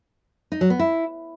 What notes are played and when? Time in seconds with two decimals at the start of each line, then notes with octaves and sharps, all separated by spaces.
0.52 D#4
0.61 F#3
0.70 B3
0.79 E4